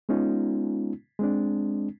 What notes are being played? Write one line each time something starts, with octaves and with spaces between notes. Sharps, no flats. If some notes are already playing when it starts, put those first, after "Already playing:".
G#3 B3 C#4 D#4 F4
G#3 C4 D4